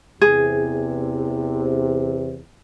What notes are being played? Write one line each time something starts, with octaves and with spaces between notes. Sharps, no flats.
E2 C3 G#4